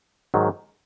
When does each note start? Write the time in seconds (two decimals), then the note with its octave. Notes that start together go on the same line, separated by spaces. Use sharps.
0.34 G#2 D#3 F#3